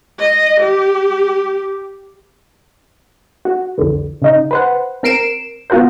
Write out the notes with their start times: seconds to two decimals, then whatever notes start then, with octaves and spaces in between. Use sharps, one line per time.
0.19 D#5
0.60 G4
3.45 F#4
3.78 C2 F2 D3 E3
4.22 C#3 D#4
4.51 B4 C5 F#5
5.03 C4 A#4 C7 D7 E7
5.70 B3 F4 F#4 A#4 C5